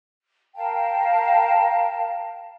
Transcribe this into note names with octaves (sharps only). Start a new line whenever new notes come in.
A#4 F5 G5 A5